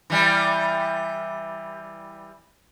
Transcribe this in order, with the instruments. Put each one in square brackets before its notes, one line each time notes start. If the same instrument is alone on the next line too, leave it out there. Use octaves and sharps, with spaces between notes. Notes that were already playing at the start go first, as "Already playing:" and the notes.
[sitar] E3 G3